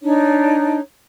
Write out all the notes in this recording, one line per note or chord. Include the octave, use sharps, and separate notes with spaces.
D4 D#4 C#5